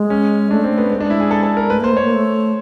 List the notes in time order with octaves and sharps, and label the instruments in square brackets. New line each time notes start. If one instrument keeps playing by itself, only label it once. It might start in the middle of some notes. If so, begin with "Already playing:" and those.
Already playing: [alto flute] G#3
[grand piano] C#4
[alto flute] A3 [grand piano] D4
[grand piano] C4
[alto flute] A3
[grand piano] B3
[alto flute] G#3 [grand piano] C4
[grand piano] D4
E4
G#4
A4
A4
A#4
[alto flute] A3 [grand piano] B4
[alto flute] A#3 [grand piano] C5
[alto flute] A3 [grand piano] C#5
[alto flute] A#3
A3